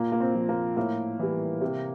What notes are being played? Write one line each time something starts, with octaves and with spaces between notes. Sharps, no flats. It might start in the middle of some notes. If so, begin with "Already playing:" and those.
Already playing: A#2 A#3
A#3
C4
F3
A#3
A2 A#3
E3 G3
C3